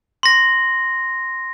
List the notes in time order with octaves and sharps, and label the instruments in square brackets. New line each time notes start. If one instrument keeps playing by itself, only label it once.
[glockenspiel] C6 A#6